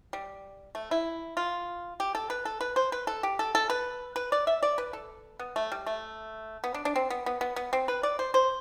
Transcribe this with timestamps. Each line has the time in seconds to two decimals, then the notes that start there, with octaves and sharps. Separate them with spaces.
0.13 G3
0.75 A3
0.91 E4
1.37 F4
2.00 G4
2.15 A4
2.30 B4
2.45 A4
2.61 B4
2.76 C5
2.92 B4
3.07 A4
3.23 G4
3.39 A4
3.55 A4
3.70 B4
4.16 B4
4.32 D5
4.47 E5
4.63 D5
4.78 B4
4.93 A4
5.39 B3
5.56 A3
5.72 G3
5.87 A3
6.64 B3
6.74 D4
6.85 D4
6.96 C4
7.10 B3
7.26 B3
7.41 B3
7.56 B3
7.73 C4
7.88 B4
8.03 D5
8.19 C5
8.34 C5